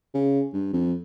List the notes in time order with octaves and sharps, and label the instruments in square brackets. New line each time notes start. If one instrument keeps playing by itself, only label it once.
[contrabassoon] C#3
G2
F2